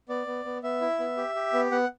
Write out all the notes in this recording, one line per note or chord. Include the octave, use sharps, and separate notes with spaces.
B3 D5
B3
B3
B3 E5
E4
B3
G4
G4
B3
B3 F#5